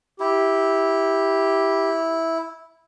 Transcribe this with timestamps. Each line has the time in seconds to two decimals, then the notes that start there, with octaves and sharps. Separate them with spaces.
0.20 E4 G4